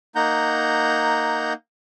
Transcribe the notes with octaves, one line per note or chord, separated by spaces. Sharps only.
A#3 D#4 F#5 A#5 G6